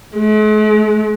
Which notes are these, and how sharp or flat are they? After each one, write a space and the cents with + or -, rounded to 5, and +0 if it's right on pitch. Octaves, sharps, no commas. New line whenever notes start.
G#3 +45